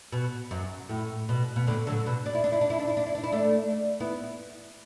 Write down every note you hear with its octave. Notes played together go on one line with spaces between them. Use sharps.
B2
F#2
A2
B2
B2
A2 D3
D3 F#3
B2
D4
E4
D4
E4
D4
E4
D4
E4
D4
E4
D4
E4
A3 D4
B3 E4